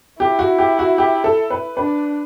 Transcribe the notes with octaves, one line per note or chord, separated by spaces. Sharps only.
E4 G4
F#4
G4
F#4
G4
A4
B4
D4 B4